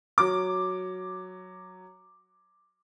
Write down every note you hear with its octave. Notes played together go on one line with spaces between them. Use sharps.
F#3 D6